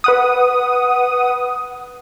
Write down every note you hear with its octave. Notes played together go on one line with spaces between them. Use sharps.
B4 F#5 D#6